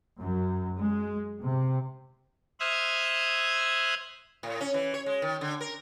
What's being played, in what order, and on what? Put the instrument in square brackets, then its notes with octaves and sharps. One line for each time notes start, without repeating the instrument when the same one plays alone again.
[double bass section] F#2
G#3
C3
[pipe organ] C5 E5 D#6 F6 F#6 G#6
[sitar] A2
C#4
E3
C#5
G#3
D#3
D3
A#4